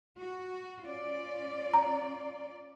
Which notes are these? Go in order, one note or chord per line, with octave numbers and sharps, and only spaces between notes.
F#4
C#4 F4 D5
A#5